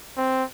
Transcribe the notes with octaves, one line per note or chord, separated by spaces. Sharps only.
C4